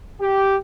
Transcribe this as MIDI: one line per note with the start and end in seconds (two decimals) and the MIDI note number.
0.20 0.56 67